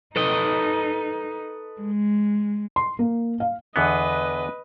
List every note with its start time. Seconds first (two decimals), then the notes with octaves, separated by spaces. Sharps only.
0.16 D#4 A4 B4 D#5
1.81 G#3
2.76 C6
2.99 A#3
3.40 F5
3.76 E2 D3 B3 B4 D#5